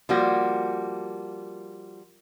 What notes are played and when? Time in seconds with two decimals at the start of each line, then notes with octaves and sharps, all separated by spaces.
0.09 F3 G3 A#3 F#4